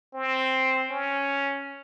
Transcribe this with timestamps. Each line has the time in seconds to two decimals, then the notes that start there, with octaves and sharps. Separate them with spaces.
0.14 C4
0.90 C#4